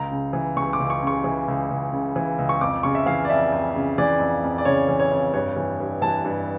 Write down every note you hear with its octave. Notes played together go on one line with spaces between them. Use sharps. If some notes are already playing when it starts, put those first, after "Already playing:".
Already playing: C#2 A#5
C#3
E3
C#2 C#6
D6
C#2
C#6
C#3 C#6
E3
C#2
C#2
C#3
E3
C#2
C#6
F2 D6
C#3 C#6
E5
E3 F5
D5
F2 E5
F2
C#3
E3 D5
F2
F2
D5
C#3 C#5
E3
C#5
F2
G2 C#5
E3
G2
E3 A5
G2